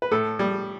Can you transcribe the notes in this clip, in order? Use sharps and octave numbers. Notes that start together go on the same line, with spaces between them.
B4
A2 A4
G3